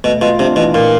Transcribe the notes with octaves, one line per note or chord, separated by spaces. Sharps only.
B2 A3
B2 F4
C3 D4
B2 E3
A#2 F4